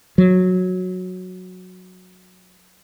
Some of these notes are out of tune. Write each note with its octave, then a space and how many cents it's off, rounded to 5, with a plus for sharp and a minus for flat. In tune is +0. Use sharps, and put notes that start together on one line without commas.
F#3 -10